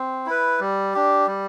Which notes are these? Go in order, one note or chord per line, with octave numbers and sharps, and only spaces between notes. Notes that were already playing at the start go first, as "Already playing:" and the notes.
Already playing: C4
E4 B4
G3
D4 G4
G3